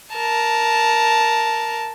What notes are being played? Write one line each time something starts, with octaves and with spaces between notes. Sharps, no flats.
A#4 A5